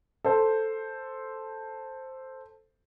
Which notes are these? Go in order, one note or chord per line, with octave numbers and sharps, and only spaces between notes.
A4 C5